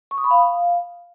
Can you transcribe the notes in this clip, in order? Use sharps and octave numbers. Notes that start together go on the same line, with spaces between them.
C#6
D#6
B5
F5